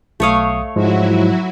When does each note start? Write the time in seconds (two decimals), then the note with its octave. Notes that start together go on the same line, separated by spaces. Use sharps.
0.20 B1 A3 C#5 F5 D#6
0.76 G#2 F3 F#3 G#3 E4 F#4